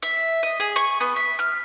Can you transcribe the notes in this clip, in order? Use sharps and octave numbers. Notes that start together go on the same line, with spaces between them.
E5
D#5
G#4
C#6
B3
E5
F6